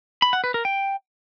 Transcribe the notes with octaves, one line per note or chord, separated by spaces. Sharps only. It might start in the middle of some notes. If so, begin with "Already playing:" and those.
B5
F#5
B4
A#4
G5